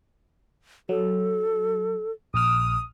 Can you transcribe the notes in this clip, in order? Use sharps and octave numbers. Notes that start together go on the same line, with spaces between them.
F#3 A4
A#1 D#6 F6